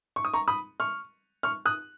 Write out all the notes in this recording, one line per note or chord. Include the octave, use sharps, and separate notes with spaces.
C#6
D#6
A#5 C#6
B5 D#6
C#6 F6
C#6 F6
D#6 F#6